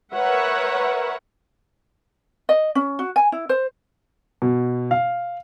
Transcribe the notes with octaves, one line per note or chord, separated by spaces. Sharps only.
A#4 B4 C#5 E5 F#5
D#5
C#4
F#4
G#5
E4
C5
B2
F5